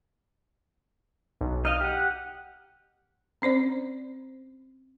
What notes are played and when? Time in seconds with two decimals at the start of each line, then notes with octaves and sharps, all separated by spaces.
1.41 B1
1.65 D#4 D#5 F5 F6
1.81 G4 F#5
3.42 C4 C#4 C5 D5